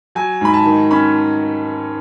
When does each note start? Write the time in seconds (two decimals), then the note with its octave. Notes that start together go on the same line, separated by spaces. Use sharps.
0.15 F#3 G#5
0.41 G#2 B5
0.54 A5
0.65 D#3
0.91 C#4 B5